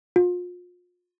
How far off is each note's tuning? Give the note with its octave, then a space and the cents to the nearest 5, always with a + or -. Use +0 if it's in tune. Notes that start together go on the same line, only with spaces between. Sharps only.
F4 +35